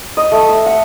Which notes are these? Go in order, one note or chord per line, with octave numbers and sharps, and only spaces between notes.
D#5
A3
E5
F#5